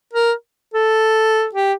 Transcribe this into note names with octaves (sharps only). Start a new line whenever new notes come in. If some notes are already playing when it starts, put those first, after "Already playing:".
A#4
A4
G4